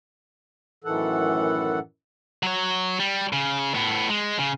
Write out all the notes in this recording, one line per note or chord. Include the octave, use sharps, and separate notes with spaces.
F#2 A2 D#3 E3 A4 F#5
F#3 C#5
G3
C#3
A2 B3
G#3
C#3